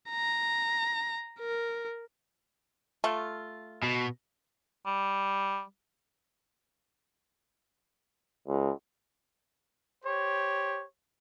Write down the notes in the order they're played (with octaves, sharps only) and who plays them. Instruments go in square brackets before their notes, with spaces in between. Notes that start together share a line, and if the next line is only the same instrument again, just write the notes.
[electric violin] A#5
A#4
[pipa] A3 F4
[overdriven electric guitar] B2
[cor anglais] G3
[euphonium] C#2
[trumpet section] G4 C5 C#5